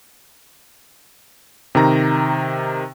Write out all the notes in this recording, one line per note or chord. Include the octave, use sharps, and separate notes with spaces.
C3 D#3 A#5